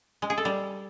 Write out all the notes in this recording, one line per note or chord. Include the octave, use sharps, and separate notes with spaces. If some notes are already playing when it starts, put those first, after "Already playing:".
G#3
G#4
A4
G3